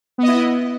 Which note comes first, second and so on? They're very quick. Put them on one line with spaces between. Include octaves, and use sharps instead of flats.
B3 D#5 E4